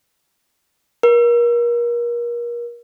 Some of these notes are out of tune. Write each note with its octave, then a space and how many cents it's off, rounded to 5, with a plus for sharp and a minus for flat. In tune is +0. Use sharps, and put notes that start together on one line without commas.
A#4 +30